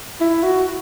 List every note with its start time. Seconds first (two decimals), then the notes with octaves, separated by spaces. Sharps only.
0.21 E4
0.43 F#4